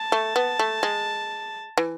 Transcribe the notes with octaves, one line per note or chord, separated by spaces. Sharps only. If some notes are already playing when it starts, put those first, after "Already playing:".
Already playing: A5
A3
B3
A3
G#3
E3